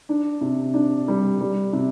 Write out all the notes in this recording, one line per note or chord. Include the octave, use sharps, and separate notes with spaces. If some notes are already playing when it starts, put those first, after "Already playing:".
D4
C3
D4
G3
G3
C3